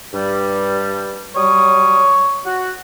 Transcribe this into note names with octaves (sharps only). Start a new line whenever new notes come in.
G2 G3
F#3 G3 C#5 D#6
F#4